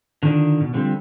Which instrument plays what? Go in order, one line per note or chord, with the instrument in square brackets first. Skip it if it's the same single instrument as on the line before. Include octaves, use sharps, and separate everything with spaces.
[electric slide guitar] D3 D#3 F3 D4
B2
D3 F3 G3 C4